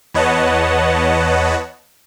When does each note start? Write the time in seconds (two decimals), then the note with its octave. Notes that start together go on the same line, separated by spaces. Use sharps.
0.14 E2 B4 C#5 D#5 F#5 A5